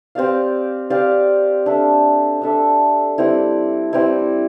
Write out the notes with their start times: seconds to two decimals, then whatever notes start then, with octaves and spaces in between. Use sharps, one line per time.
0.15 C4 G4 D5 F5
0.90 C4 G4 D5 F5
1.66 D4 A4 E5
2.42 D4 A4 E5
3.18 G3 C4 E4
3.93 G3 C4 E4